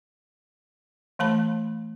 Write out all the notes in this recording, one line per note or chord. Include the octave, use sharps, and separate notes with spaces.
E3 A3 A5 B5